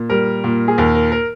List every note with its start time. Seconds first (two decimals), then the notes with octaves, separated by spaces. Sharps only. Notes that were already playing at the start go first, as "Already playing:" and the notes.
Already playing: A#2
0.10 G3 A#4
0.44 A#2
0.68 G#4
0.78 D#2 A#4
0.94 A#4
1.12 A#4